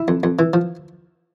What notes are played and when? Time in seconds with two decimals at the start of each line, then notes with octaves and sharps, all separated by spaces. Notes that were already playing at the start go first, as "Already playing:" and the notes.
Already playing: E4
0.08 F2
0.23 F2
0.39 E3
0.54 F3